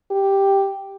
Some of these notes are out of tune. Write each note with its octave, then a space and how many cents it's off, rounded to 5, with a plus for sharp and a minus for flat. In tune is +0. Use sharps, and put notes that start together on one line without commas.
G4 +0